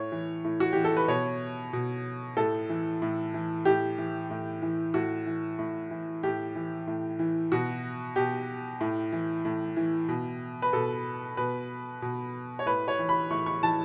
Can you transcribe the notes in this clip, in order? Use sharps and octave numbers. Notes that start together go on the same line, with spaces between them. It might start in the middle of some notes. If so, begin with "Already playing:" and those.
Already playing: A2 C#5
E3
A2
F#4
E3 G4
A4
B4
B2 C#5
B2
A2 A4
E3
A2
E3
A2 G4
E3
A2
E3
A2 F#4
E3
A2
E3
A2 G4
E3
A2
E3
B2 F#4
B2 G4
A2
E3
A2
E3
B2
B4
B2 A4
B2 B4
B2
C#5
A2 B4
C#5
E3
B5
A2 C#6
C#6
E3 A5